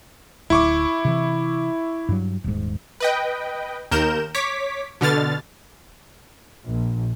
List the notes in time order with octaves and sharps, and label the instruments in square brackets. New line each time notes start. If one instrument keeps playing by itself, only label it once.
[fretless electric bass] D1 [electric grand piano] E4 C#6 D6
[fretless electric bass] C3 E3
G2 F#3
D#1 G#2
[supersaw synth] B4 D#5 G5
D#2 A#4 G6 E7
C#5 D6 B6
B2 D3 F6 A6
[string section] A#1